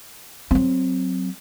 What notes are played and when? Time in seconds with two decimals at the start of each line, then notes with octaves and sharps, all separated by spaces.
0.51 F#3 C4